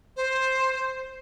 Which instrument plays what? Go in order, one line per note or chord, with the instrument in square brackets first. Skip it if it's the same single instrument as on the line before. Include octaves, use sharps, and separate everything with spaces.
[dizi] C5